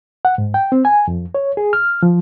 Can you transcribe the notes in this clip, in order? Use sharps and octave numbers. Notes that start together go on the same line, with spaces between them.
F#5
G#2
G5
C4
G#5
F2
C#5
G#4
F6
F3